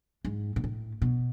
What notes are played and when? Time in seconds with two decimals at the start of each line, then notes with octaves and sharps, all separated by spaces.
0.25 G#2
0.56 A#2
0.64 A2
1.02 B2